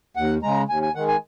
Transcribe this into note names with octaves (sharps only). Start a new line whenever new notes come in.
D#2 F#5
C#3 G#3 A#5
D#2 G#5
G#5
D#3 G#3 F#5
G#5